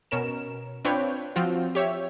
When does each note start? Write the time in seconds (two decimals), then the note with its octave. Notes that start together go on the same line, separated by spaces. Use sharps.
0.11 B2 C#4 A#4 E7
0.85 C4 D4 F4 B4 C#5 G5
1.36 F3 C4 F4 F#4
1.75 G4 C#5 E5